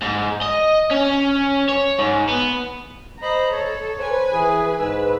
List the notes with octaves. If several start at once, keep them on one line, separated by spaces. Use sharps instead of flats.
G#2
D#5
C#4
C#5
G#2
B3
C5 D#5 A#5 B5
A4 C#5
B4 C5 G#5
E3 G#4
G#2 B4 E6